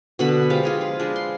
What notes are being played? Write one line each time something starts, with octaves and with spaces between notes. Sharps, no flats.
B2 D3 B5
F3 G#3 G4 F5
F4 G#4 A#5
B4
G#3 D4
C6